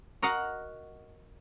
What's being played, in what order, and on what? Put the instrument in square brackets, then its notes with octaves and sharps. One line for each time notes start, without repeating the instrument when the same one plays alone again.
[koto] F#4 A#4 D#5 F5 F#5